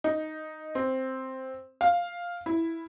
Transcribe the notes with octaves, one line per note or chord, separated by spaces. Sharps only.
D#4
C4
F5
E4